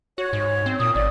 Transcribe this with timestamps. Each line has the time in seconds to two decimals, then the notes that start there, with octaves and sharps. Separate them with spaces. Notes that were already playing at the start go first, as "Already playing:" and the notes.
0.18 F#4 C#5
0.33 G#2
0.66 C4
0.80 A#2 D#6
0.95 G#1 D5